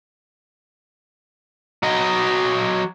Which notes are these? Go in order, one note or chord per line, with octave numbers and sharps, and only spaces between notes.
F#3 D#5